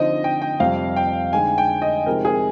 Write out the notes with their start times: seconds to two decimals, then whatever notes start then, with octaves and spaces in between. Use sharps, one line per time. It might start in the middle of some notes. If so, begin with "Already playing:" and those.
Already playing: D3 F3 C4 D#4 D#5
0.24 G5
0.42 G5
0.60 F2 C3 G3 F5
0.97 G5
1.33 D3 G#3 D#4 G#5
1.58 G5
1.82 D#5
2.06 C3 F3 G#3 D#4 A#4
2.25 G#4